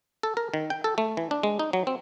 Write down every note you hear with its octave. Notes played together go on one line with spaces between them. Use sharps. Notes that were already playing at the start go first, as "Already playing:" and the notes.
A4
A#4
D#3
G5
A4
A3
E3
D4
G#3
D#4
F#3
C4